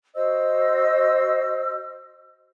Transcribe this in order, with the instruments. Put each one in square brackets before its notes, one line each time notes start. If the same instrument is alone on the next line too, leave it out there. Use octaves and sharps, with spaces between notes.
[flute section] F#4 C5 D#5 E6